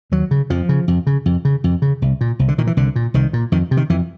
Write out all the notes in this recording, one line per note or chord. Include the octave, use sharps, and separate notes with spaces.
D#2 F#3
C#3
F2 F3
C#3
F2
C#3
F2
C#3
F2
C#3
C2
A#2
C2
D3
A#2 D#3
E3
C2 D3
A#2
C2 D#3
A#2
F2 D#3
C3
D#3
F2 E3